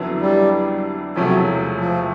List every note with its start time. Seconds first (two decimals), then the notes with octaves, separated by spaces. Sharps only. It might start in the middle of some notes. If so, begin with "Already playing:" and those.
Already playing: F2 D3 F#3 B3 E4
0.21 G3
1.16 E1 E2 C3 F3 F#3 A3
1.80 F3